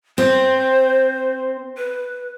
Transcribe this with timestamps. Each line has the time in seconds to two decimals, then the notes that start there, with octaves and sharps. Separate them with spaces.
0.18 C4 C5
1.77 B4